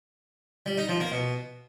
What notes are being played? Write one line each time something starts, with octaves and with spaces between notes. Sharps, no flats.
G3
D#4
F3
A#3
B2